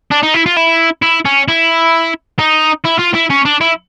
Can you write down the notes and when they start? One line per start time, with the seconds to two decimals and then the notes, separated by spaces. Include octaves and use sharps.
0.12 D4
0.23 D#4
0.34 E4
0.46 F4
0.57 E4
1.02 E4
1.26 C#4
1.48 E4
2.39 D#4
2.85 E4
2.99 F4
3.15 E4
3.30 C#4
3.45 D4
3.61 E4